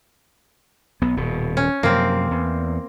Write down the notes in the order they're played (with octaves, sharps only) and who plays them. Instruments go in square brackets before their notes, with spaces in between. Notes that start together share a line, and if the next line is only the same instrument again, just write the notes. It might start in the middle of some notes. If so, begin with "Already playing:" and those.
[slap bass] B1 B3
D#1 B2
[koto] C#4
[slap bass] F#2 C3 F3 [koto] A#3 C4
[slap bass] E2